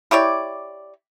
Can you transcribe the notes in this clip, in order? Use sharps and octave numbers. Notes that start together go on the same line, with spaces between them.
E4 G4 C#5 D5